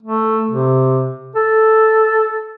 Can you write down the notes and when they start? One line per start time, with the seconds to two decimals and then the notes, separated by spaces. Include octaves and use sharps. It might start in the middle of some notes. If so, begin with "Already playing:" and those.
0.03 A3
0.51 C3
1.36 A4